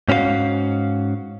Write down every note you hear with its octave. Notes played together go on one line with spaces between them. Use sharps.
G#2 C#4 F#4 B4 F5